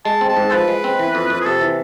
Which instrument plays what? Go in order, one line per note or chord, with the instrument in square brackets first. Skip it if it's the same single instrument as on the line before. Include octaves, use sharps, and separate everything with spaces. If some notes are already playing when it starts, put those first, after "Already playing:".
[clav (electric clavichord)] G#3 [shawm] A5
[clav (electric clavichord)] C4
[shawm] A5
[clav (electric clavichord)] G#2
[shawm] A4
[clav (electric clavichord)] F3 [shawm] B4
[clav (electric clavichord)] G#3
C4
E3
F2
F2
[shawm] G#4
[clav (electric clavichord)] C3 [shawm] A4
[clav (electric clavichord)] E3